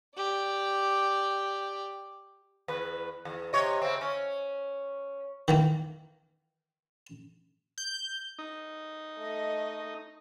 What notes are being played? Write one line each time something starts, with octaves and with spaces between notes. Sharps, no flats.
G4 D5
E2 B4
E2
C3 C#5 D#5
C#3 C4
C#4
D#3 E3 A#3
G6
D#4
A3 D#5